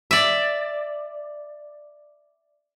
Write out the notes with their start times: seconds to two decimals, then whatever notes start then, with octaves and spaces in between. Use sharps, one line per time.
0.11 D5 E5